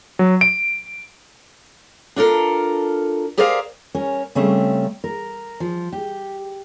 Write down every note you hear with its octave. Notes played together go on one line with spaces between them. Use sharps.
F#3
D7
D4 F4 A4 A#4
G4 G#4 A#4 C5 D5 F5
C#4 A#4 C#5
C#3 G3 A3 C4 C#4
A#4
F3
G4